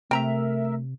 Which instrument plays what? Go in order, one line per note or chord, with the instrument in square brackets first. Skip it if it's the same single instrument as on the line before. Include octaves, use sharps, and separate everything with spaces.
[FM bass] C3 [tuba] A3 [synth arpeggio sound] A#4 E5 [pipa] G5 A#5